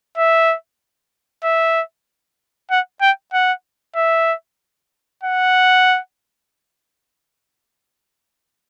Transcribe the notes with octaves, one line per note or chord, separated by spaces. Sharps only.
E5
E5
F#5
G5
F#5
E5
F#5